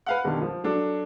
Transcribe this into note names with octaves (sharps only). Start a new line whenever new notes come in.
B4 F5 F#5
B2 D3 D#3 G3
F3
F#3 D4 A4